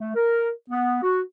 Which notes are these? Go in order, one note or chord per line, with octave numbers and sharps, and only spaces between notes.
A3
A#4
B3
F#4